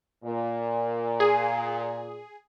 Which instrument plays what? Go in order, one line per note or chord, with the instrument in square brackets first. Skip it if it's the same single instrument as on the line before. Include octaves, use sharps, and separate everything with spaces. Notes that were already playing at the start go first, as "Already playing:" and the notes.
[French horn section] A#2
[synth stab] G#4